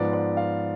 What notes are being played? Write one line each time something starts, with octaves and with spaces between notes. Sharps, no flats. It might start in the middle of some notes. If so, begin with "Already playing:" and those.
Already playing: G#2 F3 B3 D5
D5
F5